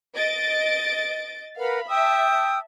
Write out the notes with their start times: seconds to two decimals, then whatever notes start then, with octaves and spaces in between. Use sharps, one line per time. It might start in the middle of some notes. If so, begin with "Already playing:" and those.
0.14 D#5 A6 D7
1.58 A#4 B4 F5 F#5 B5
1.90 E5 G5 A5 D#6 E6